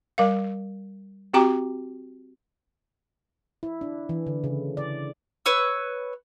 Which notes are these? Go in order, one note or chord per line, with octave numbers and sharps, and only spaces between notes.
G3 A#4 F5
C4 F#4 G4 G5 A#5 D6
E4
D4
E3
D3
C#3
D5
B4 C#5 E6